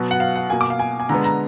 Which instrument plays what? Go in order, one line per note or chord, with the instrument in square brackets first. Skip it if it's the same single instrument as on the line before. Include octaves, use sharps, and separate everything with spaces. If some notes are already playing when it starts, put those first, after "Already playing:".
Already playing: [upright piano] B2 F#3 B3
F#5
F5
F#5
B2 A#3 G#5
D6
F5
G#5
G#5
D3 G#3 B3 A#5
A#5